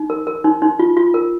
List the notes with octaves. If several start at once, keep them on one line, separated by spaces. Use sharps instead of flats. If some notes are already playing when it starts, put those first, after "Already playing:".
Already playing: D#4
A#4
A#4
D#4
D#4
F4
F4
A#4